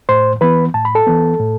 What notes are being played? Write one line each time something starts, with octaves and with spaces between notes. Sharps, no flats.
A2 C5 C6
E3 B3 B4 B5
A2 A5
B5
A4 A5
E3 B3
A2